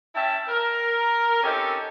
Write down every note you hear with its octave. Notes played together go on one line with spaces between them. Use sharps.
C#4 E4 E5 G5 A5
A#4
C4 C#4 D#4 G4 A4